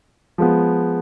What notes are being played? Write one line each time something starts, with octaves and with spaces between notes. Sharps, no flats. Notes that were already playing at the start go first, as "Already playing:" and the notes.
F3 G#3 B3